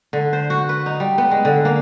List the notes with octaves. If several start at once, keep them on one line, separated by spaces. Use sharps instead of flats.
D3
C5
F#4
B4
D#4
G3
B3
G#3
D3
A#3